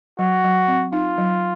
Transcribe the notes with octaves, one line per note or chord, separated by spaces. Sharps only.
F#3 F#4
F#3
C4
D#4 F4
F#3